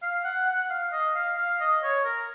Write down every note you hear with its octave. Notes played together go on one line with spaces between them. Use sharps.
F5
F#5
F#5
F5
D#5
F5
F5
D#5
C#5
A#4